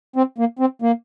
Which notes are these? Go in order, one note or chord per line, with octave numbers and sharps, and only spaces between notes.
C4
A#3
C4
A#3